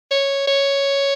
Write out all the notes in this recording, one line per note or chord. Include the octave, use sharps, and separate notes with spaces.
C#5
C#5